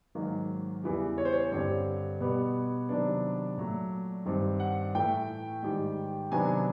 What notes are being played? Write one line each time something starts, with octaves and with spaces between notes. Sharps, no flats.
G#2 D#3 F#3 A#3
E2 C#3 E3 G3
C#5
C5
C#5
G2 D3 G3 C4 C#5
B2 G3 B3
C3 D#3 F#3 B3 D4 D5
A#2 F#3 A3
G2 D#3 G3 C4
F#5
A2 E3 A3 G5
G#2 D#3 G3
C3 D#3 F#3 B3 D4 G#5